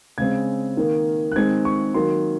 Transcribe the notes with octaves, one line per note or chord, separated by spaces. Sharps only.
C#3 G#3 C4 G#6
D#3 A#3
F#6
D#3 G#3 C4 G#6
C#6
D#3 F#3 A#3 C6